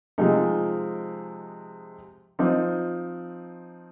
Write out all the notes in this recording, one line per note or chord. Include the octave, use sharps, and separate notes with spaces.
C3 F3 G#3 D#4
F3 C4 D#4